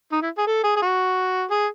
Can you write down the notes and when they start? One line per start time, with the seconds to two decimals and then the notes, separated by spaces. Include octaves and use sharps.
0.12 D#4
0.22 E4
0.38 G#4
0.47 A4
0.64 G#4
0.77 G#4
0.82 F#4
1.51 G#4